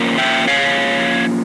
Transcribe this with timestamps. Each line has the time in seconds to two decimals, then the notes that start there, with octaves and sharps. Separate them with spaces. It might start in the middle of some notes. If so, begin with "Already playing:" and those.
Already playing: F3 A#3 C#4
0.18 E5 G5
0.47 C#5 F5